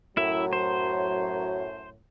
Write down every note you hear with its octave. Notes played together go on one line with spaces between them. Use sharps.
F#2 A2 F#3 E4 E5
C5